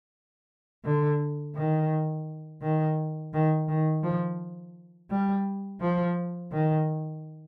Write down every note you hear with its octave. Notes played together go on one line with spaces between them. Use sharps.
D3
D#3
D#3
D#3
D#3
F3
G3
F3
D#3